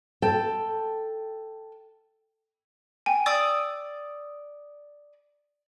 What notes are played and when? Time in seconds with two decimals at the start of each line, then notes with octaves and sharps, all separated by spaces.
0.22 A4 G5
3.06 G5 G#5
3.26 D5 D#6 E6